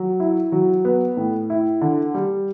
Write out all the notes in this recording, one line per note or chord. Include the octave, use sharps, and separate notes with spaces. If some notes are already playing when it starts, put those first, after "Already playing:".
Already playing: F#3
E4
F#3
B3
A2
E4
D3
G3